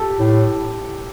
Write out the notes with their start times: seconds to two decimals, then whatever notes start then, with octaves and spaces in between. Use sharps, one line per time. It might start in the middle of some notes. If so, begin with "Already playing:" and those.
Already playing: G4 A4
0.19 A2